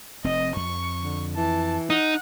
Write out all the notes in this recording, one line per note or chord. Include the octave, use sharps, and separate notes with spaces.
F1 C4 D#5
F2 C#6
D3
E3 A5
D#4 F#5